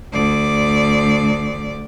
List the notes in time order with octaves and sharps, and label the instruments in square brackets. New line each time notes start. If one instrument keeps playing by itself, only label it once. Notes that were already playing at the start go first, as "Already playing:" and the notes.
[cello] D2 D5